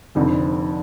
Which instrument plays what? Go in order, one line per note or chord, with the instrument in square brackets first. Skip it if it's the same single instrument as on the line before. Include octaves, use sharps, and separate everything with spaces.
[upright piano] F1 F2 D3 [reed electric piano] D#4